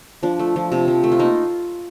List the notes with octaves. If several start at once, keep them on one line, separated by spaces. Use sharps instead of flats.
F3 D4
A3
F3
C3
F3
A3
F4
A#3 D#4